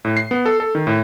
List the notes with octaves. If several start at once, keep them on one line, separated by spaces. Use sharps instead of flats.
A2
C7
B3
A4
A4
D#3
A2